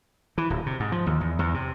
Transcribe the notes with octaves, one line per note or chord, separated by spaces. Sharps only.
E3
D1
C3
G#2
F3
D#2
E2
E2
C3